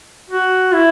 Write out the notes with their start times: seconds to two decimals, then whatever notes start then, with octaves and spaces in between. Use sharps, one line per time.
0.30 F#4
0.74 E4